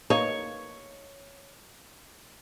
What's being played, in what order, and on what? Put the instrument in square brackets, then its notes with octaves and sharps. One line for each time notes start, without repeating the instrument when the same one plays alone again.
[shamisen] A#3 D#4 [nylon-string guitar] C#5